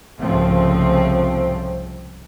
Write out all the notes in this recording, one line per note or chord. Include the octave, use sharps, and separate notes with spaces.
C2 G#2 C#3 F3 A3 C4